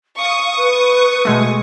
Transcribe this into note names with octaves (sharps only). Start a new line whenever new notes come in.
F5 C#6 D#6
B4
B2 G#3 A3